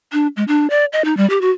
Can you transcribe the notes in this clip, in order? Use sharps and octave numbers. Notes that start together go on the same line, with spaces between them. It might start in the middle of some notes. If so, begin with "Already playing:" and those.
D4
G#3
D4
D5
D#5
D#4
G3
G4
F#4